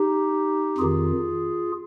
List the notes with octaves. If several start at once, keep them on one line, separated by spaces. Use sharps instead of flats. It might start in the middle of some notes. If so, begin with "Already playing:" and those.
Already playing: D#4 G4
F2 D#3 F4 G#4